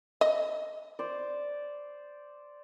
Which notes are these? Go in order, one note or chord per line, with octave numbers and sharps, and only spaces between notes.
D#5
C5 D5